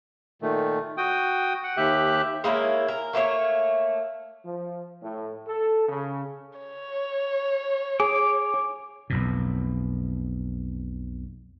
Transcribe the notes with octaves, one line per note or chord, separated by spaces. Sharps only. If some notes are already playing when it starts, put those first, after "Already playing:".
A#2 D#3 A3
F#4 G5 D#6
F#5
D#2 G4 E5 F#6
G#3 A#3 E4 C#5
A#4
A3 A#3 A#4 C#5
F3
A2
A4
C#3
C#5
G#4 D6
B1 F2 B2